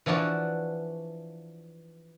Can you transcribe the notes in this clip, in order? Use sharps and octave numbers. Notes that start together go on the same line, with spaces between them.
E3 F3 D4 F#4 D5